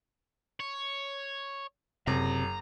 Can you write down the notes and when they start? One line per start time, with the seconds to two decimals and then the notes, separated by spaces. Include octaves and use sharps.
0.60 C#5
2.07 F#1 C3 A#5